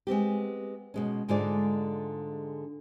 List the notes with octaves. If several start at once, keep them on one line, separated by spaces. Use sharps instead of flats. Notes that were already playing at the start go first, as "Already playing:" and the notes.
G#3 B3 C4 G4
B2 G#3 C#4
G#2 D3 G#3 F4 G#4 D5